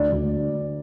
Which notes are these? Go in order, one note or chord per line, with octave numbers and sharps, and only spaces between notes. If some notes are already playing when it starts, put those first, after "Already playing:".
Already playing: D2 D5
D2